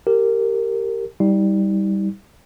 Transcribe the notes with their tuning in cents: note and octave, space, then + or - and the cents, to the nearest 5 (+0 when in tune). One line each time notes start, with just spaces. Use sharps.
G4 +0 A#4 -20
G3 +0 D#4 +45